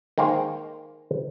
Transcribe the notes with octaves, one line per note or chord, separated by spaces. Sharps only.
D#3 G#3 A#3 A#4 C5